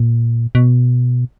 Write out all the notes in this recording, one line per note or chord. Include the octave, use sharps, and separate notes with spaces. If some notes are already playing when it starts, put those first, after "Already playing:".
Already playing: A#2
B2